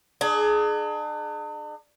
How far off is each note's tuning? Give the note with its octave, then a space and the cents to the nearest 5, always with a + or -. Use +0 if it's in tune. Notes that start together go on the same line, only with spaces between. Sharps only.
D4 +45 G#4 +25